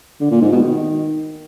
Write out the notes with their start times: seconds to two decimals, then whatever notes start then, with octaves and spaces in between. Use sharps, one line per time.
0.20 D3
0.31 A#2
0.41 G#2
0.52 B2
0.62 D#3